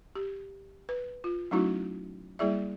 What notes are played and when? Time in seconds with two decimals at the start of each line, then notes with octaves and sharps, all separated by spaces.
0.16 G4
0.89 B4
1.24 F4
1.51 F#3 A3 C#4 D#4 E4 F#4
2.39 G3 A#3 E4 G#4 D5 E5